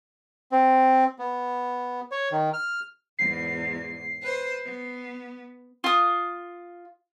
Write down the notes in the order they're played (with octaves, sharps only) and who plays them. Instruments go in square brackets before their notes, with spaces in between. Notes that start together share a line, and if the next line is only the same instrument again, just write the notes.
[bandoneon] C4
B3
C#5
D#3
F6
[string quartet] E2 G#2 [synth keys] C7
[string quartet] B4 C5
B3
[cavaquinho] F4 D#6